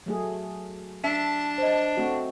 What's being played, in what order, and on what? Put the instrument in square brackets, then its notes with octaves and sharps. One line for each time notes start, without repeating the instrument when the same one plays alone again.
[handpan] F#3 A3 G#4
[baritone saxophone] D4 [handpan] E5 [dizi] A5
[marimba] C5 D#5
[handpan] A3 C4 F#4